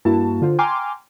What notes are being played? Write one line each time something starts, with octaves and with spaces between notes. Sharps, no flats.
G2 A#3 E4 F#4 A5
D3 F4 C5
G5 G#5 A#5 C6 D6 F6